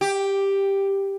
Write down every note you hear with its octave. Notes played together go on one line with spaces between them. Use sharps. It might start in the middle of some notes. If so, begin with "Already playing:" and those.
G4